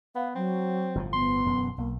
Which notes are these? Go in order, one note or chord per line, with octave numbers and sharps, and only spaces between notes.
B3 F5
F#3 C4
G1 A2 F3
B3 C6
E1 F#2
B1 A#3